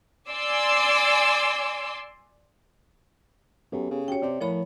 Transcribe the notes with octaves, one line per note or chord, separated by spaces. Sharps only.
D5 G#5 C6 D6 E6
F#2 B3 G4 A4
C#3
C#4 F#4 G4 C#5 G5
C3 D5
A2 F3 A#4 C#5 B5